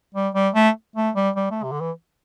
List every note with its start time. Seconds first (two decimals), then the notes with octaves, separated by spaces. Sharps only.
0.15 G3
0.35 G3
0.55 A3
0.96 A3
1.15 G3
1.36 G3
1.51 A3
1.63 C3
1.72 D3
1.80 E3